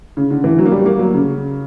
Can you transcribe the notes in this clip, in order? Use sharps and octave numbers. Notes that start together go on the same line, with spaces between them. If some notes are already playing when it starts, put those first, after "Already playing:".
C#3
D3
E3
F#3
A#3
G3
A#3
F#3
C#3